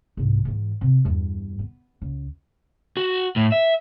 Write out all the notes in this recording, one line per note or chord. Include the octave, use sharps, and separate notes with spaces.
C2 G#2
G#2 E3
C3
E2 G2
B3
C#2
F#4
A2
E5